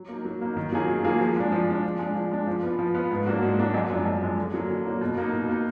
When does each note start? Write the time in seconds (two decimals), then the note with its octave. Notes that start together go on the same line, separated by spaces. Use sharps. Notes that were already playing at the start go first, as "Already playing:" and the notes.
Already playing: F#3
0.09 A#3 D#4
0.25 F#3
0.41 A#3 D#4
0.57 D#3
0.72 F#3 A#3 F4 G#4
0.88 D#3
1.04 F#3 A#3 F4 G#4
1.20 F3
1.36 G#3 D4
1.52 F3
1.68 G#3 D4
1.84 F3
1.99 G#3 D4
2.15 F3
2.31 G#3 D4
2.47 F3
2.63 B3 F4
2.79 F3
2.95 B3 F4
3.11 G#2
3.26 F#3 A#3 D4 F#4
3.43 G#2
3.58 F#3 A#3 D4 F#4
3.74 F#2
3.90 F3 G#3 D4
4.06 F#2
4.22 F3 G#3 D4
4.38 D3
4.54 F#3 A#3
4.70 D3
4.85 F#3 A#3
5.01 B2
5.18 A#3 D#4
5.33 B2
5.49 A#3 D#4